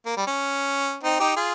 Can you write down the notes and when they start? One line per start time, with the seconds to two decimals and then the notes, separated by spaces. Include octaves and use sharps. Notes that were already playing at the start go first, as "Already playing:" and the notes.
0.06 A#3
0.17 G3
0.27 C#4
1.03 C4 D#4
1.20 D#4 G4
1.36 F4 G#4